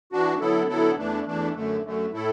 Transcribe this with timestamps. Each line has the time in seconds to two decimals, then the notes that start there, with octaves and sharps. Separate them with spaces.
0.12 E3 D4 F#4
0.40 D3 F#3 B3 E4 A4
0.69 D3 F#3 B3 E4 A4
0.97 E2 E3 A3 D4
1.26 E2 E3 A3 D4
1.55 F#2 D3 A3
1.83 F#2 D3 A3
2.12 A2 A3 E4 A4